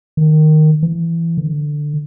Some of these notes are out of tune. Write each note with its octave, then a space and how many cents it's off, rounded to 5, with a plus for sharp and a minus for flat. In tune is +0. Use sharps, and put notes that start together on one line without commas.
D#3 -10
E3 +15
D3 +10